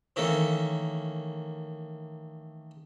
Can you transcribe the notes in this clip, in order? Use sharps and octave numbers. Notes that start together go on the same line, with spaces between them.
D#3 E3 A3 A#3 C#4